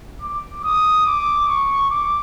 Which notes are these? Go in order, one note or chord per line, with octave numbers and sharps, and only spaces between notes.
D6
D#6
D6
C#6
D6